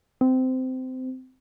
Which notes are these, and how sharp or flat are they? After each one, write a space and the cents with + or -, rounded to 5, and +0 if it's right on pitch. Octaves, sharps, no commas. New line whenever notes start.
C4 -20